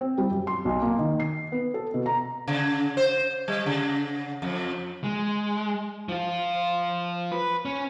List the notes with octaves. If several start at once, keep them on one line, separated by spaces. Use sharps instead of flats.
C4
G3
F#2
C6
B1
A#3
D#3
C7
B3
A4
B2
A#5
C#3
C5
G3
C#3
F2
G#3
F3 F4
B4
C#4